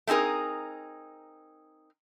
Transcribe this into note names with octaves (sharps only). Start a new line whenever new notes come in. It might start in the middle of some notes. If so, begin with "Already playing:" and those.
A3 C4 D#4 G#4 A#4